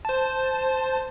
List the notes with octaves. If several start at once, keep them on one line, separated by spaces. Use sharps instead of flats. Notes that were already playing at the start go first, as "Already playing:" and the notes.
C5 A5